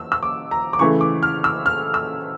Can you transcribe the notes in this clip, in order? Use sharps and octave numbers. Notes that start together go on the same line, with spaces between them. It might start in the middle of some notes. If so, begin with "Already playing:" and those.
Already playing: E6
E6
D6
A#5
D6
C#3 E3 A3 C#6
D6
F6
E6
F6
E6